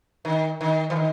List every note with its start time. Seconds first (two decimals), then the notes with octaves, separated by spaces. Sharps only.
0.25 D#3
0.61 D#3
0.90 E3
0.96 D#3